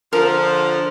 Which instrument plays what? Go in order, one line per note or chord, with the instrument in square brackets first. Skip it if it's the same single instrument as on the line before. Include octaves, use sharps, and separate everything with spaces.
[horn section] D3 F3 [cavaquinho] A#4